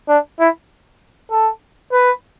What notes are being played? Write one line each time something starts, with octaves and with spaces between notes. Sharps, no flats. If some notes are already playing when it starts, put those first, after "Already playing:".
D4
E4
A4
B4